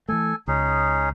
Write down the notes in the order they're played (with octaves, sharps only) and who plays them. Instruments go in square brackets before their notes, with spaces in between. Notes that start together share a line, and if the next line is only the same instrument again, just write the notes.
[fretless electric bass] E3 F3 A3 [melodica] A4 G#5
[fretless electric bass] C#2 [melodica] C#4 D#4 G#4